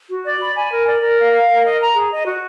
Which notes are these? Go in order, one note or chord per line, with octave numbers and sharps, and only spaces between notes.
F#4
D5
B5
G#5
A#4
D5
A#4
F5
F5
A#4
D#5
A#5
G#4
D#5
F#4